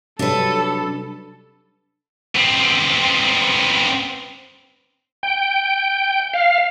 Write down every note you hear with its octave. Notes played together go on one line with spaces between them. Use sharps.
C3 F#3 G3 D4 A4 B4
B3 C4
G5
F5